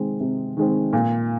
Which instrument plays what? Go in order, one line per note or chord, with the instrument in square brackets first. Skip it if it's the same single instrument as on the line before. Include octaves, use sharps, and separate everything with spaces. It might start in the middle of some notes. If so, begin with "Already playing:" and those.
Already playing: [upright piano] C3 D#3 G#3 C4
C3
D#3 G#3 C4
A#2